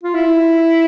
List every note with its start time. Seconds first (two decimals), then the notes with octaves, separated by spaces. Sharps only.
0.03 F4
0.15 E4